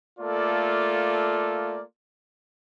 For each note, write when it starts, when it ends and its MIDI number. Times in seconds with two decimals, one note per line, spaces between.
0.20 1.83 57
0.20 1.83 58
0.20 1.83 65
0.20 1.83 69
0.20 1.83 74